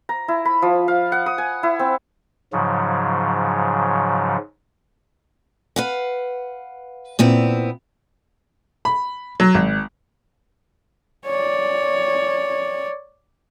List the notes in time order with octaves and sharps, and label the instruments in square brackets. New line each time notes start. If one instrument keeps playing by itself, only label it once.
[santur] A#5
E4
B5
F3
F5
F#5
D#6
G#5
E4
C4
[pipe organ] G#2 C#3 F3 F#3
[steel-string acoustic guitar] B4 F5 F#5
A#2 B3 C4 E4
[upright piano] B5
F#3
G#1
[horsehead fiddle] C#5 D5